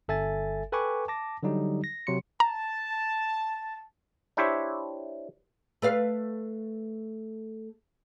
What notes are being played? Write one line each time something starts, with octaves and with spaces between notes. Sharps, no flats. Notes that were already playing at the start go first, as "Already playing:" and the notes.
G1 A4 E5 G#5 A6
A4 B4 G5 G#5 C#6 D6
A5 D6 A#6
D3 F#3 G3 D#4 G4
A#6
C3 F#3 C6 C#7
A5 A#5
D4 E4 G4 C5 C#5 E5
A3 B4 F5